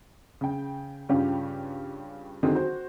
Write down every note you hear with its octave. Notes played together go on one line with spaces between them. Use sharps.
C#3 G5
G2 C#3 C#4 F4 G4
D3 D#3 C4 F#4 G#4
F#4 C5